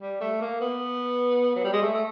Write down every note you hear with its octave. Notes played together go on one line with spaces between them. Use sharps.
G3
A3
A#3
B3
F#3
G3
G#3
A3
A3